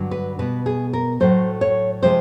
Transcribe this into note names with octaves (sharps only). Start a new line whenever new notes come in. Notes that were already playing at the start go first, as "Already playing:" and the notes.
Already playing: G2 D3 F#3
B4
B2 G3 B3 B4
G#4
A#4
A2 F#3 A3 C5
C#5
C3 F3 G#3 C5